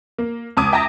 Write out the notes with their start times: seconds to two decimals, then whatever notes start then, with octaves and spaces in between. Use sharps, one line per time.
0.18 A#3
0.57 C#2 A5 D6 D#6 G#6
0.72 E5 G5 A5 A#5 A#6